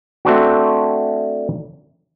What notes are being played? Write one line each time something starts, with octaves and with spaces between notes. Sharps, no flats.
A3 C4 D4 F#4